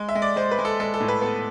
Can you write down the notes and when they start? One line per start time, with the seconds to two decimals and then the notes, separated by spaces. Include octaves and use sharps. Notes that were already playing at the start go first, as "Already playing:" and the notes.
Already playing: G#3
0.09 E5
0.15 G#3
0.22 D5
0.36 G#3 C5
0.51 B4
0.58 G#3
0.65 A4
0.80 G#3 A4
0.94 A4
1.00 A2
1.08 B4
1.21 B3 A4